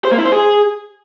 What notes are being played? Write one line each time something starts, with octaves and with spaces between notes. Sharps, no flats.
C5
A#3
E4
C5
G#4